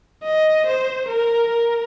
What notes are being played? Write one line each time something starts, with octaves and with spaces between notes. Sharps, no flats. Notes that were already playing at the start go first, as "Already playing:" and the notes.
D#5
C5
A#4
A#4